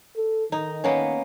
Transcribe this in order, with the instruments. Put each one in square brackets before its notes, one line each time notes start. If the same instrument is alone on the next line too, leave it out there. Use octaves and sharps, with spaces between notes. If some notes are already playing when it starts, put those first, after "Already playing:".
[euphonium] A4
[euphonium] D#3 [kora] D#4
[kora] A#3 B3 C#4